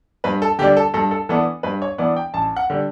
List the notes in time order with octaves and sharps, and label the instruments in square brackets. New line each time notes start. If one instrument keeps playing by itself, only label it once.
[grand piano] G2 B4
A4
D3 G4
G3 D4
A4
G2 A4
A4
E3 B3 D4 A4
G2 B4
C#5
E3 B3 D4 D5
G5
A1 A5
F#5
D3 G3